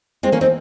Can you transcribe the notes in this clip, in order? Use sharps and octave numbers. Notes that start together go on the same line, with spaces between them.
G#3 C4
A#3 C#4
C4 D#4